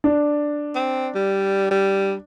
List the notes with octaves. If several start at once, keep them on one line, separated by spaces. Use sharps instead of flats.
D4
C4
G3
G3